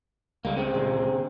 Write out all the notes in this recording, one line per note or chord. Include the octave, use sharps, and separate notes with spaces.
C#2 G3 A#3
C#3 C4
A#2 D3 G#3